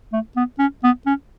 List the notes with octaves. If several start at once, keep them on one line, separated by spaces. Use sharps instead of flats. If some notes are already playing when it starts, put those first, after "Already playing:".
A3
B3
C#4
B3
C#4